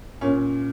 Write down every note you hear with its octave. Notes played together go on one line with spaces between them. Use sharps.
A#2 C#4